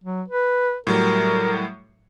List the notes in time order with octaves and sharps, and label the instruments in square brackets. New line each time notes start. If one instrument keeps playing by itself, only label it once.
[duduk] F#3
B4
[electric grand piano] A2 F#3 G3 [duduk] A#4